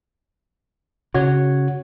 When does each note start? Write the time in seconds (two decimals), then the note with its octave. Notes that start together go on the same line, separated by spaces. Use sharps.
1.14 C#3 F#4 C#5